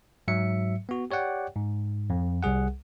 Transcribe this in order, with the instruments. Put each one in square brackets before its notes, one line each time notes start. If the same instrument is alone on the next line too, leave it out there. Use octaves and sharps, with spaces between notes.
[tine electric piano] G#2 F#3 E5 C#7
B3 F#4
G4 C#5 D5 F#5 G5
G#2
F2
C2 G3 G#4 F#5